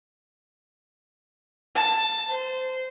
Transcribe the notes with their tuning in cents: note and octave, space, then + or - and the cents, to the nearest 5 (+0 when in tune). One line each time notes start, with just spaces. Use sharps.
A5 +10
C5 -20